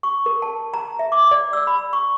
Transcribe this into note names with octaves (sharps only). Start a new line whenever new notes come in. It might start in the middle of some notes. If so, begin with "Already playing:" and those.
C#6
A#4
A5
A#5
E5
D6
D5
E6
B5
C#6